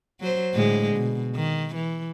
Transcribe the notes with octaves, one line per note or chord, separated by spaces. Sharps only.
F#3 C5
A2 D3 G#3
B2
D#3
E3